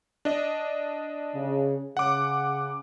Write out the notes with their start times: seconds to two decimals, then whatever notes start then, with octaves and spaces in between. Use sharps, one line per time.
0.25 D4 D#5
1.35 C#3
1.97 C#3 F#5 D6